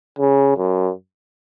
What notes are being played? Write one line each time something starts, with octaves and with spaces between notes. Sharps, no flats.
C#3
F#2